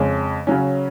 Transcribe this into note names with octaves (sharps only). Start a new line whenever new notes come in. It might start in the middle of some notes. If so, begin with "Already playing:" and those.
Already playing: F2 C#3 G#3 C#4
C#3 F#3 C#4